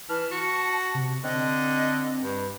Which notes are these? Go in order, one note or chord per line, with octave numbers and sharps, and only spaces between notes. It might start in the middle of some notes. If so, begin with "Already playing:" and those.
E3 A5 F6
F#4 C#7
C3
D3 C4 D#5
G2